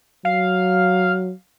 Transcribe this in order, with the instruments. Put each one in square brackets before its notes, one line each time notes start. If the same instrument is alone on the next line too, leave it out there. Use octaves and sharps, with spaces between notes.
[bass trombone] F#3 [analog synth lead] F5